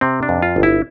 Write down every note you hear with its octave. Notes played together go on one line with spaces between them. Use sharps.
C3 C4
D4
F2
F4
G1
E4